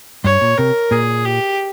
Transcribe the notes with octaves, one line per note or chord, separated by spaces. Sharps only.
G2 C#5
A#2
C3 A#4
A#2 G#4
G4